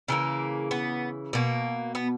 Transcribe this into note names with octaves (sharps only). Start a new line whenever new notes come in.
C#3 E3 A#3
B3
B2 A#3
B3